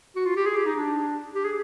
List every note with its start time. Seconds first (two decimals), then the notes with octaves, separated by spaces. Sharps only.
0.16 F#4
0.26 F4
0.36 G4
0.46 G#4
0.56 G4
0.66 D#4
0.76 D4
1.35 G4
1.45 G#4